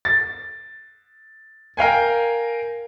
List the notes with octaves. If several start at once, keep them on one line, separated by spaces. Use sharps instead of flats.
A6
A#4 F5 G5 G#5